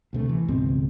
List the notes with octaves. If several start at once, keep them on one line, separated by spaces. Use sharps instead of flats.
D2 C3 A3
E3
C#2 G#2 B2 C4